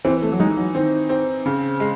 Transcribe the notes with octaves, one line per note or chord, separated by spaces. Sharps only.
E3 C4
A3
F#3
G#3 D#4
F#3
D#3 C4
C4
C#3
G#3